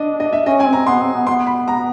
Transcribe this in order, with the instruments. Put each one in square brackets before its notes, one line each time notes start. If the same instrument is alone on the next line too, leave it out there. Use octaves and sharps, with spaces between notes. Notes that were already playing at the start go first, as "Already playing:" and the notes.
Already playing: [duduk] D4 [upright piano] D5 D#5
[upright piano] D#5
E5
[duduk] C#4 [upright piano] D#5
[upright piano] G#5
[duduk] C4
[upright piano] A#5
[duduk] B3 [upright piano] C6
[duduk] C4
B3
[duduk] B3 [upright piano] C6
[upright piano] B5
A#5